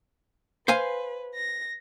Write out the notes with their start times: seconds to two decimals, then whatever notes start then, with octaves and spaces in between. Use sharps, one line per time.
0.68 B4 C5 F5 G#5
1.36 A#6